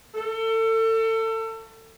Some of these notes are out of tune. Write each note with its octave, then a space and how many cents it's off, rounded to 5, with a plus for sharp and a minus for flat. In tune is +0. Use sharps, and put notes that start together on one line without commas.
A4 +30